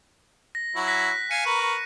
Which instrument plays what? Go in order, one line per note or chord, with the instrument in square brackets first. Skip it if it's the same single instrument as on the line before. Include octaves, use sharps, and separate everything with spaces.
[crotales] A#6
[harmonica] F#3 E4 F#4
[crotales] F#6 A#6 B6
[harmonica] F5 G#5 [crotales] C#7 D#7
[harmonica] A#4 B4 C#6